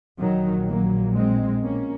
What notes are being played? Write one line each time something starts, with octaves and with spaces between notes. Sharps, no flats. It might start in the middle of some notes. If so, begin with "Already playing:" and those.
A#1 A#2 D#3 F#3
F#3 A#3
G#3 C4
A#3 C#4